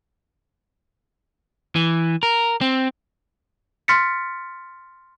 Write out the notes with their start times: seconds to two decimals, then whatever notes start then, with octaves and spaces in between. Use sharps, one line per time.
1.75 E3
2.23 A#4
2.61 C4
3.88 C6 F6 A6 B6 C#7